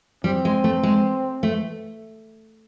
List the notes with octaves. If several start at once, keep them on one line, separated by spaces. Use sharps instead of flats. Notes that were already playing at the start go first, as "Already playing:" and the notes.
G3 C4
G#3
A3
G#3
A3